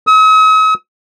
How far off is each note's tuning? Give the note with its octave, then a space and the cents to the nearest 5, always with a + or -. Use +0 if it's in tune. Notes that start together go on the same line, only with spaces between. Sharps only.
D#6 +45